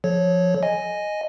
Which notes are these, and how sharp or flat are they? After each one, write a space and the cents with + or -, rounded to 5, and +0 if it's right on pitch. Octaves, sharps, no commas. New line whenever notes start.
F3 +0 A4 -40 C#5 +0
D#5 -5 G#5 +0